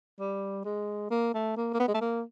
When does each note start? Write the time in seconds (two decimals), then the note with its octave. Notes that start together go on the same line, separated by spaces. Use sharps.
0.20 G3
0.65 G#3
1.10 A#3
1.34 A3
1.57 A#3
1.74 A#3
1.80 B3
1.88 G#3
1.94 A3
2.01 A#3